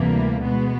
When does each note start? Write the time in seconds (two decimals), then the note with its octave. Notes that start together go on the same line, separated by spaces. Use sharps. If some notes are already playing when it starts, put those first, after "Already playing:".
Already playing: D2 C3 E3 G3 A#3
0.42 B2 G#3 B3